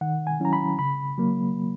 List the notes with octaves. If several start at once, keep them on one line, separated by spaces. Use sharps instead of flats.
D#3 F#5
G#5
F#3 C#4 E4 A#5
B5
C#3 B5
F#3 A#3